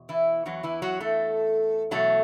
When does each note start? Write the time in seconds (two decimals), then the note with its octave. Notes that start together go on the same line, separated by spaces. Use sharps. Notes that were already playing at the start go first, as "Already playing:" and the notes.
Already playing: E2 B2
0.09 E3 E4
0.46 E2 E3 F#3 F#4
0.63 E3 E4
0.82 F#3 F#4
1.00 A3 A4
1.91 E2 B2 F#3 A3 A4